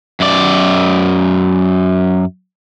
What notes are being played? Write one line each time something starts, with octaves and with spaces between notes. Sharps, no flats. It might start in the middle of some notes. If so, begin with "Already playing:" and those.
F#2 D5